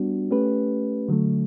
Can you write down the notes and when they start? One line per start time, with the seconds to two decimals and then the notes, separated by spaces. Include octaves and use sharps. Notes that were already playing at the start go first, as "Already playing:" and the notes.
Already playing: G3 B3 D4 F#4
0.31 A3 C#4 G4 B4
1.08 D3 F#3 A3